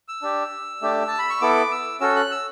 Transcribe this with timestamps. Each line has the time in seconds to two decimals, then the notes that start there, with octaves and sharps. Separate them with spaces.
0.08 E6
0.22 D4 G4
0.82 A3 D4 G4
1.08 A5
1.19 B5
1.30 C#6
1.41 B3 E4 A4 D6
1.71 E6
2.00 C#4 F#4 A4 E6
2.16 F#6
2.31 E6